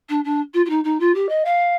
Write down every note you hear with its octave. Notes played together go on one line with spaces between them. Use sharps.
D4
D4
F4
F4
D#4
D#4
F4
G4
D#5
F5